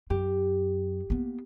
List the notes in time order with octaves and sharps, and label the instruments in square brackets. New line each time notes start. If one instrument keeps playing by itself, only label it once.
[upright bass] F#2 [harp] G4
[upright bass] A#3 B3